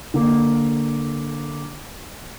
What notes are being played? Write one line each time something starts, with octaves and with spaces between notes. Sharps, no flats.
D3 A#3